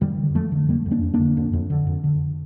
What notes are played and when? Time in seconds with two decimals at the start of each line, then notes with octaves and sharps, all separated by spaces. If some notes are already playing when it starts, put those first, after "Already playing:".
0.01 F2 D#3 G3
0.18 D3
0.35 F2 F3 A3
0.52 D3
0.68 F2 G3 A#3
0.86 F2
0.91 A#3 D4
1.03 F2
1.14 A#3 D4
1.20 D3
1.37 F2
1.53 F2
1.70 D3
1.87 F2
2.04 D3